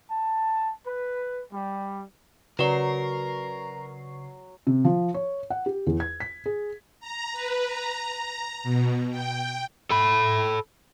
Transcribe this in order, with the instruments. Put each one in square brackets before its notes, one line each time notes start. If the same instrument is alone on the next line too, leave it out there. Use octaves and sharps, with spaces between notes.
[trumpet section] A5
B4
G3
[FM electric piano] C#3 C#6 C7 [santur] F#3 [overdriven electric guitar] A#4 [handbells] B4 D5
[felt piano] C3
F3
C#5
F#5
G4
E2
G#6
B6
G#4
[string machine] A#5
B4
A#5
A#5
B2
G5
[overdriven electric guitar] A4 B5